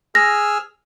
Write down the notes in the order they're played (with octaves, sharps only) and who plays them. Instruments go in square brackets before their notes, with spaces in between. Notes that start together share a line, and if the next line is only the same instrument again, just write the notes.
[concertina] G#4 E6 F6 [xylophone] A#6